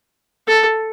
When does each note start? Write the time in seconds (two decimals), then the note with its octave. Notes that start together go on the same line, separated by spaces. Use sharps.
0.48 A4